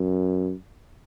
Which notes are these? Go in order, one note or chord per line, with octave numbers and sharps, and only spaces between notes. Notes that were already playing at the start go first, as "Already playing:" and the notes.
Already playing: F#2